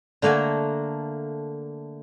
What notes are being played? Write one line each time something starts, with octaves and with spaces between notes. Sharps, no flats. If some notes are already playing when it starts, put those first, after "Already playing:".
D3 A3 A#3 A#4 G#5